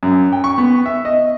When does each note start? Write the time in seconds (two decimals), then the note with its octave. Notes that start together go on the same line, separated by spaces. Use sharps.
0.03 F#2
0.32 G5
0.44 C#6
0.58 B3
0.86 E5
1.05 D#5